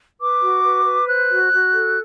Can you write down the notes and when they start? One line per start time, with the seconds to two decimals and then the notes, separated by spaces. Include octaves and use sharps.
0.20 B4 D6
0.42 F#4
0.64 B4
0.86 B4
1.07 C5 F#6
1.29 F#4
1.51 F#4
1.72 A4